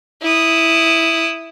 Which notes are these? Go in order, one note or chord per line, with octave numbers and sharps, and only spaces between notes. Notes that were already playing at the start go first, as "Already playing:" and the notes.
E4 D#6